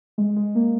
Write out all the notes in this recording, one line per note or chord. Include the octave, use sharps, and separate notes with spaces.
G#3
G#3
A#3